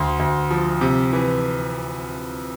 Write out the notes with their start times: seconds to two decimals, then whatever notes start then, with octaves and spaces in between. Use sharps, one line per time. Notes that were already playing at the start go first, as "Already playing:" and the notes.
Already playing: D2 C6
0.19 D2
0.51 F3
0.81 C3
1.13 E3